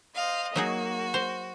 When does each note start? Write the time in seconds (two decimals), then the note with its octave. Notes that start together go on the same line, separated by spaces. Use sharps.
0.15 C5 D#5 F5
0.56 F#3 A#3 D#4 F#4 G#4
1.14 C5